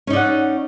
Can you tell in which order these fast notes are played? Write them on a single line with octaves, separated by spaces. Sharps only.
C#4 D#4 D5 F#5